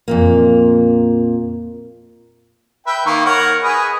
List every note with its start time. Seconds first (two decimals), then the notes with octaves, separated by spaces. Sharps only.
0.08 F2 A#2 A#3
2.87 B4 E5 G5
3.06 D#3 A#3 C#6
3.25 A#4 C#5 F#5
3.63 G#4 B4 D#5